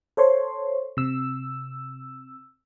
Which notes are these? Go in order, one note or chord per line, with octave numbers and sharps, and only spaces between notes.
A4 C5 C#5 C6
C3 E6